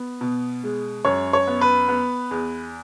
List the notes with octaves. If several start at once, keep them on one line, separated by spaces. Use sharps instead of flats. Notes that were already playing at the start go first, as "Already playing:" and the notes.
Already playing: B3
B2
G#3
F#2 C#5
C#5
B3
B4
B3
E2